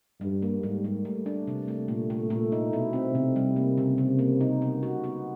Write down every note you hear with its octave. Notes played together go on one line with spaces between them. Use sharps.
G2 G3
A#3
G#2 G3
G3
A3
D4
C3
A3
A#2 A3
A3
A#2 A3
D#4
B2 E4
C4
C3 C4
G3
A#3
C#3
C#3
A#3
D#4
B3
F#4
B3